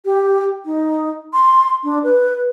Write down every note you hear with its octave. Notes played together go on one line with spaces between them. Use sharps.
G4
D#4
C6
D4
B4